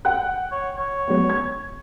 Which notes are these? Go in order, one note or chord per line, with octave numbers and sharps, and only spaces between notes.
F#5 G5 F#6
C#5
C#5
F#3 B3
G#6